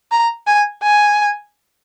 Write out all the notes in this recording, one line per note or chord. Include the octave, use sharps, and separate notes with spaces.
A#5
G#5
G#5